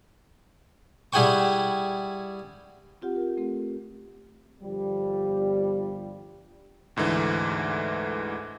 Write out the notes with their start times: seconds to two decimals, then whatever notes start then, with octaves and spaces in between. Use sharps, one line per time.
1.13 G3 E4 G#4 F#5 G5 C#6
3.02 C4 F4 G4 F#5
3.16 A#4
3.37 A3 C4 A4
4.62 G1 F3 G3
6.96 D2 G#2 D3 E3